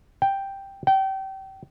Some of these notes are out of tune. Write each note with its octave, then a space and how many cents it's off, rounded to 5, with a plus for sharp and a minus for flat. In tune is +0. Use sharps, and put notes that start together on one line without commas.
G5 +0
G5 -30